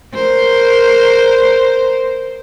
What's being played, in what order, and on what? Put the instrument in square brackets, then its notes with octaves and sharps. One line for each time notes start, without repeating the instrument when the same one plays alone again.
[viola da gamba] A#4 C5